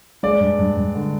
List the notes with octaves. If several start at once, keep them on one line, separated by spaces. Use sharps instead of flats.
G#3 D5
G2
G2
G2
D3